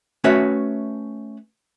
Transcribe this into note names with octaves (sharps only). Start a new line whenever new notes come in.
A3 C#4 F#4 B4 C#5 E5